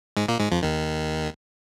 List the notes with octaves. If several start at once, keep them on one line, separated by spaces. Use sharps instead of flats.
G#2 G#3
A#2 A#3
G#2 G#3
F2 F3
D#2 D#3